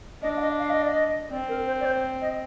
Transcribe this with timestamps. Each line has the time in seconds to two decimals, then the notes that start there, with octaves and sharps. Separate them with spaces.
0.22 D4 D#5
0.37 F5
0.41 D#5
0.58 F5
0.70 D#5
0.82 D5
0.93 D#5
1.31 C4 D5
1.49 A#4
1.67 C5
1.80 D5
1.85 C5
2.21 D#5